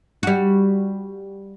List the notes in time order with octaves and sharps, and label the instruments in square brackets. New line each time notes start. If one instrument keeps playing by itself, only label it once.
[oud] G3 F#4